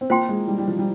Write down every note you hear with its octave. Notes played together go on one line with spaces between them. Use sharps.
C4
A#3 F4 C5 G5 C6
G#3
G3
G3
F3
G3